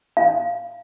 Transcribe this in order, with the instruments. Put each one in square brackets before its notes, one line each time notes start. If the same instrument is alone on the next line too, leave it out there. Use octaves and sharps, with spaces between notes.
[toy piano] F5